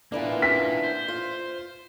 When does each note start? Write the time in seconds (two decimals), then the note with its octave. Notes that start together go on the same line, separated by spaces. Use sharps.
0.12 E3 A#3 B3 D4 F4
0.42 B6
0.84 C5
1.08 F4